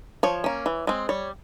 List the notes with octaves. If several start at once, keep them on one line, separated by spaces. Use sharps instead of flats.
F3 C#5
A#3 C#4
E3
G#3 C4
G3 C#5